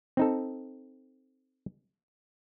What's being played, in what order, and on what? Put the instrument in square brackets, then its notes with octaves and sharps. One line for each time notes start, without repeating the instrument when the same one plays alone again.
[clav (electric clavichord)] C4 D#4 A4